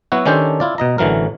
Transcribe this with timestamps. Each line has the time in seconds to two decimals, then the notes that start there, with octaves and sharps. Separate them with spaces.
0.12 F#3 B3 E4 F#4
0.26 D#3 C#4 D4 G4 A4 C5
0.60 E4 F4 D5
0.78 B2 D#5 A#5
0.98 A1 D3 E3 F#3 A#4